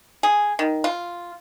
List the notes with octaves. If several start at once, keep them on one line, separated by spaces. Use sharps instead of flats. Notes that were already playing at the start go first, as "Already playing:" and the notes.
G#4
D#3
F4